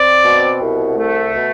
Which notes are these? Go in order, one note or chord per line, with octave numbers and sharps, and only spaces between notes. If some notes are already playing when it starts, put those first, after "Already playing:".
Already playing: C4 D5
B2
C2
A3
B2